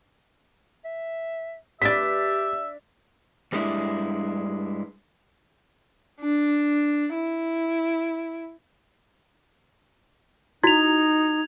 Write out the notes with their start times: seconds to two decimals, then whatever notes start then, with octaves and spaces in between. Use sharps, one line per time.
0.85 E5
1.82 D4 G4 B4 D5 E5 A6 B6
3.52 G2 G3 G#3 D4 E4
6.21 D4
7.14 E4
10.63 D#4 E4 F#4 G#6 F7